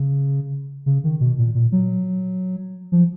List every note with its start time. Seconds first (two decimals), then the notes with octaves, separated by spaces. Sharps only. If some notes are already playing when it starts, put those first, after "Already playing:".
Already playing: C#3
0.86 C#3
1.04 D#3
1.20 B2
1.38 A#2
1.55 A#2
1.72 F#3
2.92 F3